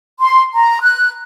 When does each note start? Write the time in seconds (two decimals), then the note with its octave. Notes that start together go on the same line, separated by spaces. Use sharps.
0.21 C6
0.54 A#5
0.81 F#6